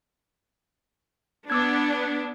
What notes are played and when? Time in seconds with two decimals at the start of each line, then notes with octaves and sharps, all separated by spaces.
1.50 B3 D4 D6 E6 G#6